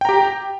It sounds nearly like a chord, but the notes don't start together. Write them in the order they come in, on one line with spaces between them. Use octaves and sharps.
G5 A#5 G4